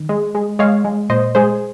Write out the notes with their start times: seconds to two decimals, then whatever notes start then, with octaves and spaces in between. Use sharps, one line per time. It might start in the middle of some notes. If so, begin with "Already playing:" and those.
Already playing: D#3
0.09 G#3
0.35 G#3
0.59 G#3 C#5 F5
0.84 G#3
1.09 A#2 C5 D#5
1.35 G#3 G#4 C5